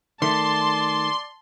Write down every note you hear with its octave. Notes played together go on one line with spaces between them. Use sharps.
D#3 A3 D5 A5 C6